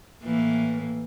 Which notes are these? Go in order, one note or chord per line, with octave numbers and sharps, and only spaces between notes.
A2 E3 A#3